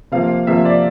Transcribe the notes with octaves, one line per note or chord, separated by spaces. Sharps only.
C3 F3 A#3 F5
C3 F3 A#3 E5
D5